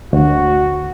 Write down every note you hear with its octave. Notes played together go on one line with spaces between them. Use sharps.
D2 F#4